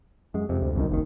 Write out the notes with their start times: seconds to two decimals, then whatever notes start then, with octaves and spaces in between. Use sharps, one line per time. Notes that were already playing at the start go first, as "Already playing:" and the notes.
0.34 F#2 G#3
0.49 F2 C3
0.62 D2
0.75 G1 C2 F#2 D#3
0.91 F#1 D#2 D#3